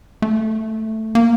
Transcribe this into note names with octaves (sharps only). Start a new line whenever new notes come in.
A3
A#3